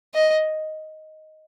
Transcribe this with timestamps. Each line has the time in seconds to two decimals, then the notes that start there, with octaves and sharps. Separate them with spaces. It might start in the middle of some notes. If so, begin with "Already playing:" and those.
0.14 D#5